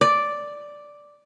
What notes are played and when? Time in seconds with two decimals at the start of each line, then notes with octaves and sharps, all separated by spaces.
0.01 D5